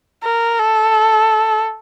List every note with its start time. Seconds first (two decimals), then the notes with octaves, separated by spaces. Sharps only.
0.23 A#4
0.59 A4